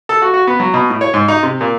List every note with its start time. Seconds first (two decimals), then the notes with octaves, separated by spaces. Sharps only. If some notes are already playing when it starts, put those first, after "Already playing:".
0.09 A4
0.22 F#4
0.34 F#4
0.47 B3
0.60 F#3
0.74 B2
0.90 A2
1.01 C#5
1.14 G#2
1.28 D#4
1.43 C3
1.61 A#2